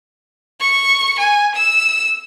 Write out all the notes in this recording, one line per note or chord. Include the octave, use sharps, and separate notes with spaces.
C#6
G#5
E6